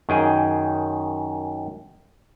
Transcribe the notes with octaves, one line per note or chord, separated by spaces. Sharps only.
F#2 D#3 G#4 G5 G#5